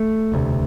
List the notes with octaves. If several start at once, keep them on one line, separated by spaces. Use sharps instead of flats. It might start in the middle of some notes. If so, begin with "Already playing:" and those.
Already playing: A3
E1 D2 C3